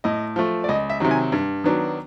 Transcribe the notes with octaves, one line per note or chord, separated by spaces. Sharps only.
A2 D#5
F3 A3
D5
C#2 D#5
E5
C3 D#3 F#3
G#5
G2
D#3 F#3 B3 D4